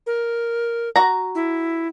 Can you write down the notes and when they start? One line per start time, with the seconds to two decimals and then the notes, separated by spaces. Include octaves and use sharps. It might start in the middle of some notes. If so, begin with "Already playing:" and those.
0.07 A#4
0.96 F#4 A#5
1.35 E4